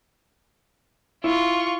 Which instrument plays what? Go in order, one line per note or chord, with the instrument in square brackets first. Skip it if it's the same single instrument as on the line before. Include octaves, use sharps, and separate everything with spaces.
[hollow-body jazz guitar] E4 [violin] F4 C#6